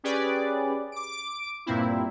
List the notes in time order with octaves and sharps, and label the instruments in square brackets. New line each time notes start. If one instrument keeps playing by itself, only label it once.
[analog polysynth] C#4 G4 G#4 B4 D5
D6 D7
G2 A#2 A#3 C4 E4